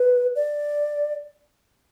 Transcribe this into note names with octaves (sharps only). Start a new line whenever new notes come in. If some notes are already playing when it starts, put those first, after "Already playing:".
Already playing: B4
D5